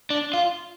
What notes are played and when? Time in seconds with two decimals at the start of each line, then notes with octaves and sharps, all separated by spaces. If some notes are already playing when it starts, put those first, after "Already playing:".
0.10 D4
0.34 F4